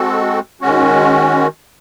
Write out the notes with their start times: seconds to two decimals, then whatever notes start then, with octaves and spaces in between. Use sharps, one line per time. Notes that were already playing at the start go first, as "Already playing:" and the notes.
Already playing: G#3 C4 F#4 A4
0.61 D#3 G#3 C#4 F#4